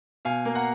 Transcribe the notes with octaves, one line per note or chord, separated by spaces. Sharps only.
B2 F5 G#5
A#3
F#5 A#5